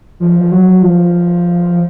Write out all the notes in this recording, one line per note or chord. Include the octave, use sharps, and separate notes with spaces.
F3
F3
F#3
F3